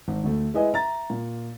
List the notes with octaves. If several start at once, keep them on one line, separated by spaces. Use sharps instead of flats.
G#1
D2 A3
G#3 E4 B4 D#5 G#5
E5 A#5 A6
A#2